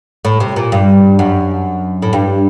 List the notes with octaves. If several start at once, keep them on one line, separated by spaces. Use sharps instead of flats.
A2
C3
A#2
G2
F#2
A2
G2